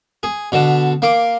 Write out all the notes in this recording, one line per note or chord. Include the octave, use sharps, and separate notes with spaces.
G#4
B2 D3 A5
A#3 C6 D6